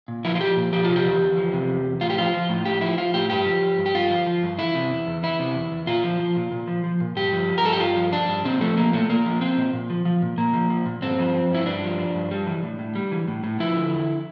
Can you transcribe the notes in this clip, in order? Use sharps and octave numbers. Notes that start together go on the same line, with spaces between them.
A#2
F3 E4
F4
F3 G4
A#2
F3 G4
C3 F4
G4
E2
E2
F3
C3
E2
E2
A2 F4
G4
F3 F4
F3
A2
A2 G4
F3 E4
F3 F4
A2 G4
G2 G4
F3
F3
G2
G4
G2 F4
F3
F3
G2
E3 E4
C3
E2
E2
E3 E4
C3
E2
E2
A#2 F4
F3
F3
A#2
A#2
F3
F3
A#2
G2 G4
F3
F3
A#4
G2 A4
G4
G2 F4
F3
F3 D4
G2
A#2 C4
F3 A3
F3 A#3
A#2 A3
A#2 A#3
F3
F3 C4
A#2
A#2
F3
F3
A#2
A#2 A#3
F3
F3
A#2
G2 C4
F3
F3
G2 E4
G2 D4
F3
F3
G2
G3
E3
A2
A2
G3
E3
A2
A2
F3 E4
D3
E2